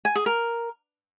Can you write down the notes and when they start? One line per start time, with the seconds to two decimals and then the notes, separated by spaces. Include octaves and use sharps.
0.05 G#5
0.16 G#4
0.26 A#4